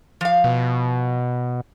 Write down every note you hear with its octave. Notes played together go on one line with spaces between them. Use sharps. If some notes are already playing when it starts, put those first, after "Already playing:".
F3 F5
B2